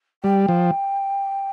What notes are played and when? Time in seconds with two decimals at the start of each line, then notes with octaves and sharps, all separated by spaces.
0.24 G3 G5
0.49 F3